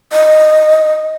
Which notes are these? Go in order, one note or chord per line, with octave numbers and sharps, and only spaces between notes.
D#5